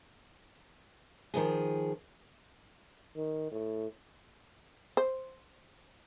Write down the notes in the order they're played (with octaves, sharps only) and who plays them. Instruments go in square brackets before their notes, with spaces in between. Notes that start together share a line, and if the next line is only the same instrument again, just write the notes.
[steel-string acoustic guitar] D#3 F3 G#4
[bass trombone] D#3
A2
[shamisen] C5